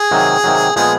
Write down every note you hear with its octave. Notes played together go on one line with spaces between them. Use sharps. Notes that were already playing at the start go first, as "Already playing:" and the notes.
Already playing: G#4
C3 D#3 F#3
C3 D#3 F#3
A#2 F3 G#3 B3 G#4